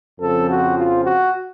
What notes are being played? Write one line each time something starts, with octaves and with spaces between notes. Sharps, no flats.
F2 C#3 F3 C4 A4
F#4
F4
F#4